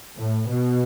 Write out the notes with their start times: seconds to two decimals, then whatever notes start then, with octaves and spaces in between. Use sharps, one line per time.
0.16 A2
0.47 B2